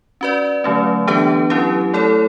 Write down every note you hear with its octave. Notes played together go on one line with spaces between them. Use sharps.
C#4 F#4 B4 D5
D3 F#3 A3 C#4
E3 B3 D4 G4 B4
F#3 C#4 E4 G4
A3 E4 A4 C#5